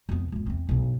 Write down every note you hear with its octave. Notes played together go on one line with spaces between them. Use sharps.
F2 B3
G#1 F2
E2 C4
B1 G2